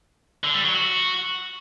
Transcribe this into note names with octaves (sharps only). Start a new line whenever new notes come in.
D3
G3
F#3
F#4